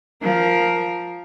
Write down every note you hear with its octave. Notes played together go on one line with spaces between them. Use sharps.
F3 A#4